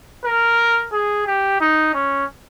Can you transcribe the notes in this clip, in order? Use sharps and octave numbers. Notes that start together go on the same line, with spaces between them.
A#4
G#4
G4
D#4
C#4